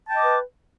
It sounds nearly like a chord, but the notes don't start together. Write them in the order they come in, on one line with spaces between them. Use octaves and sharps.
A5 G5 D#5 D6 B4